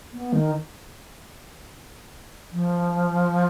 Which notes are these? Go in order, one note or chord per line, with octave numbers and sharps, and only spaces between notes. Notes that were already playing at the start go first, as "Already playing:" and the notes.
B3
D#3
F3